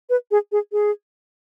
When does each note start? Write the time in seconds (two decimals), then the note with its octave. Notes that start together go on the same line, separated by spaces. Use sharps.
0.10 B4
0.31 G#4
0.52 G#4
0.72 G#4